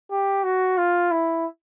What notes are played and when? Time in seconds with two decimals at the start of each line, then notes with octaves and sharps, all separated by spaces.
0.11 G4
0.44 F#4
0.78 F4
1.11 E4